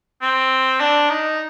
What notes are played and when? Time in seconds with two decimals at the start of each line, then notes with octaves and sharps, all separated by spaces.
0.22 C4
0.80 D4
1.10 D#4